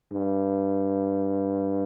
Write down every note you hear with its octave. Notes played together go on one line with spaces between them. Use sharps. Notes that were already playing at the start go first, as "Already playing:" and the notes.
G2